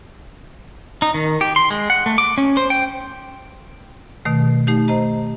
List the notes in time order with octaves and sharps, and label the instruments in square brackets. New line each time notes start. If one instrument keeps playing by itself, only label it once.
[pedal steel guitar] D#4
D#3
G4
C6
G#3
F#5
A3
D6
C#4
C5
G5
[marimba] B2 D#3 A3
A3 D#4 G4
C5 D#5 A#5